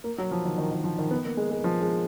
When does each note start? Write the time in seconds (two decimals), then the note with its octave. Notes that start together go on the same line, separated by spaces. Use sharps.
0.04 A#3
0.18 F#3
0.31 F3
0.45 D#3
0.58 D#3
0.71 D#3
0.84 F3
0.98 D#3
1.11 B3
1.25 A#3
1.37 G#3
1.51 G#3
1.64 F3
1.82 G#3